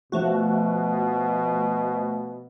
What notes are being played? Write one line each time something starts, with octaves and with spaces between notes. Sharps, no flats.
B2 F3 A3 F#4